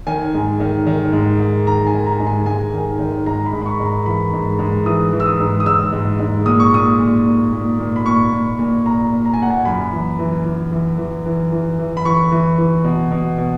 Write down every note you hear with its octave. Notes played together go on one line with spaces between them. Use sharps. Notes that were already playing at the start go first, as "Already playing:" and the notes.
D#3 G#5
G#2
D#3
D#3
G#2
G#2
D#3 A#5
G#5
D#3
A#5
G#2
G#5
G#2 G#5
D#3
D#3
G#2 A#5
B5
G#2
B5
C#6
G#2
A#5
E3 B5
G#2
G#2
E3 D#6
E3
E6
D#6
G#2
D#6
G#2 E6
G#2
G#2
A#2 D#6
C#6
A#2 D#6
A#2
A#2
A#2
A#2
B5
A#2 C#6
A#2
A#2
A#2 A#5
A#2
A#5
G#5
A#2 F#5
G#5
F#2 B5
E3
E3
E3
E3
E3
E3
E3
E3
B5
E3 C#6
E3
E3
B2
B2
B2